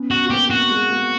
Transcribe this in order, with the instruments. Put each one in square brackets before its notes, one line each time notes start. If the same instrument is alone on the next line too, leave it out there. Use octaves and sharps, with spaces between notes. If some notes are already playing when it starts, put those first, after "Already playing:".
Already playing: [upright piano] B3 C#4
[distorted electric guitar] F#4
[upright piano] A#3 C4 [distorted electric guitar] G4
[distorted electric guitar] F#4
[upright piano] G#3 A#3
G#3 A#3